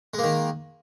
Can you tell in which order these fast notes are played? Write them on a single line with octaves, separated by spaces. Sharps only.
G#3 A#3 D#3